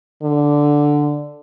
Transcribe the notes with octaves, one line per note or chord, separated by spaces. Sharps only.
D3